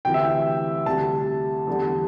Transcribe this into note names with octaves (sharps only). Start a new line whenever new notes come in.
D2 C3 E3 G5
E5
G5
D2 C3 G3 A5
E2 D3 G3